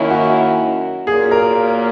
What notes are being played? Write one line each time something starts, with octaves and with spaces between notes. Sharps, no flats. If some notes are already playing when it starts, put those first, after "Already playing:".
Already playing: F#2 D#3 A#3 C#4 E4
F#4
A#2 F#3 A#3 G#4
A#4